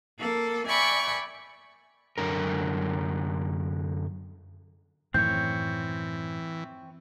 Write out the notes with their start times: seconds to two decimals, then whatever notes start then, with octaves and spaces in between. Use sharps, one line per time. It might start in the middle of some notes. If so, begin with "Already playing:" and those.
0.19 A#3 A4
0.67 D5 E5 G5 G#5 B5 C#6
2.18 F#2 D3 A#4
5.14 F#2 A2 D#3 E3 C4 C#5 G6